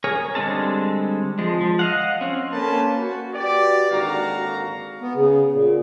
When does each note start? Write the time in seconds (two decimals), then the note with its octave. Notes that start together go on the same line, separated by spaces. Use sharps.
0.04 G#4 A#4 C#5 G#5
0.35 D3 G3 G#3 C4 A5
1.39 F3 G#3
1.61 F3
1.79 D#5 F5 F#5
2.21 C4 C#4
2.52 A#3 C#4 A4 B4 C5 A5
2.97 F#4
3.34 F#4 G4 B4 D5
3.91 G#1 D#2 D3 F#4 F5 A#5
5.02 B3
5.14 C#3
5.52 A#2